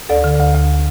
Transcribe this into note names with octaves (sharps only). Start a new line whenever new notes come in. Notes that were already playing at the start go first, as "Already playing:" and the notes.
D2 A4 D5
D3
D2
D2